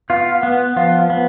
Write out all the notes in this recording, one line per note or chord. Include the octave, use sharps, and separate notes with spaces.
B3 F4
B3
F3 F4
B3